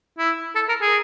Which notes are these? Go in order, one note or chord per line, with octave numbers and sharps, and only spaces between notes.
E4
A4
A#4
G#4